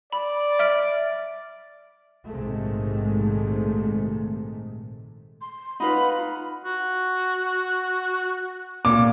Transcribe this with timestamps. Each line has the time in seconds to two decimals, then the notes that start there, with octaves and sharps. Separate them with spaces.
0.12 D5 B5
0.59 E5 F6 D7
2.29 A#1 G#2 C3 D#3 G#3 A3
5.41 C6
5.80 D#4 F4 B4 F#5 B5
6.64 F#4
8.85 A#2 D6